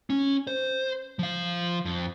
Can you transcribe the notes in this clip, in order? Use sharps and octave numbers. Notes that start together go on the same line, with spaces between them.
C#4
C5
F3 F5
F2